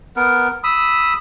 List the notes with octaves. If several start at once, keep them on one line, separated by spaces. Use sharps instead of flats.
B3 A#4
B5 D#6 E6